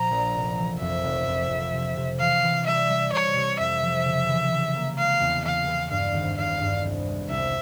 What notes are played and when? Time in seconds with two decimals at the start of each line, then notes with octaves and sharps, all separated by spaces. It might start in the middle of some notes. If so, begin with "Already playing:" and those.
Already playing: A#2 F3 A#5
0.11 A#1
0.34 F1
0.58 E3
0.81 F2 E5
1.04 F1
1.27 F2
1.50 F2
1.73 C3
1.97 C3
2.20 E3 F5
2.43 E3
2.66 G3 E5
2.90 G3
3.12 C3 C#5
3.36 C3
3.59 F2 E5
3.83 F3
4.05 C#3
4.29 E3
4.51 E3
4.75 A#3
4.98 G#3 F5
5.21 E2
5.45 E3 F5
5.67 E3
5.91 G2 F5
6.14 G#1
6.38 G#1 F5
6.60 G2
6.84 C2
7.07 G#3
7.30 C2 E5